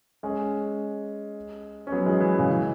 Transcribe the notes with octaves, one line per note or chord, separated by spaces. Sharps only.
G#3 C#4
C#4
F#3 B3
E3 G#3
E3
C#3
E3